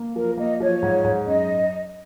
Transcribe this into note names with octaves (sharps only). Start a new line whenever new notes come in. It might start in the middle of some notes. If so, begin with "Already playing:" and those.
Already playing: A#3
F3 A#4
A#3 D#5
F3 C#5
G#2
G#2
F#2 D#5